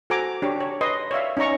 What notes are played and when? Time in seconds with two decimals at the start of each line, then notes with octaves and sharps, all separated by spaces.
0.10 F#4 A4 C5 G#5 A#5 D6
0.42 D4 G4 C#5
0.60 C#5
0.81 B4 D#5 C6
1.11 C#5 D5 E5 F5
1.37 C#4 D#4 D5 A#5 C#6